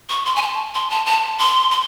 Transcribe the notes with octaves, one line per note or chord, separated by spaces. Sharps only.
C#6
C6
G#5
A5
C6
A5
A5
C6
C6